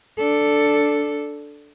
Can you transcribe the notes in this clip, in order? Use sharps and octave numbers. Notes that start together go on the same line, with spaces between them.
D4 A4